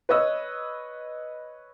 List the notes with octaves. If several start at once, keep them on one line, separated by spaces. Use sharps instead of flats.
B4 C#5 D#5 E6